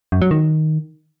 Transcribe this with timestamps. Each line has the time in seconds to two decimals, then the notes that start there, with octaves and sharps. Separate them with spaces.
0.12 F#2
0.22 F#3
0.31 D#3